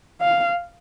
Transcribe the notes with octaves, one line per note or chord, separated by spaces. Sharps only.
F5